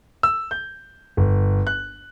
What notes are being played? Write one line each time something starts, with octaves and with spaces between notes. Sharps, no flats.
E6
G6
G1
F#6